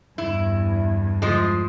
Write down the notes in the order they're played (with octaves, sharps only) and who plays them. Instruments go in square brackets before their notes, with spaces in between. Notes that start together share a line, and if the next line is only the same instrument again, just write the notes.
[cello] E2 G2 [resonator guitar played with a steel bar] E4
[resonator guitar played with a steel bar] F3 G#3